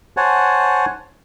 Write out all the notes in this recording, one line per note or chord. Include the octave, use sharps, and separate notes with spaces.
C5 C#5 F#5 G#5 A5